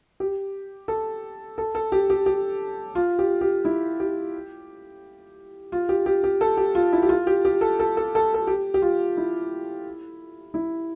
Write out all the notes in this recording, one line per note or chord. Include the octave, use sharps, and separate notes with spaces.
G4
A4
A4
A4
G4
G4
G4
F4
G4
G4
E4
G4
F4
G4
G4
G4
A4
G4
F4
E4
G4
F4
G4
G4
A4
A4
A4
A4
A4
G4
G4
F4
E4
E4